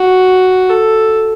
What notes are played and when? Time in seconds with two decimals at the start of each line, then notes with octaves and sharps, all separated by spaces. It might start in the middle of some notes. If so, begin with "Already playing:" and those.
Already playing: F#4
0.70 A4